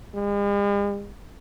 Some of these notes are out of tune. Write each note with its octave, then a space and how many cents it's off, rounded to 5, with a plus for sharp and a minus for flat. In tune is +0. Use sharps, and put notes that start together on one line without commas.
G#3 -45